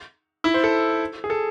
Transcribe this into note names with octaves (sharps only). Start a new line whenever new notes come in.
E4
C5
A4
G#4
A4